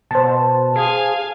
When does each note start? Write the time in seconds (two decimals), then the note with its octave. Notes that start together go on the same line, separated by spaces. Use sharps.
0.11 B2 C5 A5
0.76 G#4 F5 G#5